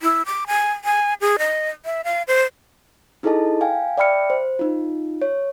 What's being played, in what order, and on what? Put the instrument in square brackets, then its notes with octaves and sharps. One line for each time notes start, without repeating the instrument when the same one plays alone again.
[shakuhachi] E4
D6
G#5
G#5
G#4
D#5
E5
F5
C5
[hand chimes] D#4 E4 G#4 A4 D#5 A5
F5 G5 G#5
D5 E5 G5 B5 F6 C#7
C5
D#4 F4
C#5